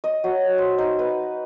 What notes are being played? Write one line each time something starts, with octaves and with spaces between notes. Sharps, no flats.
D#5
F#3
C5
D#4
B4